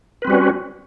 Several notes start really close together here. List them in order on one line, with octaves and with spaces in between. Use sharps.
B4 C4 G3 F#4 C#4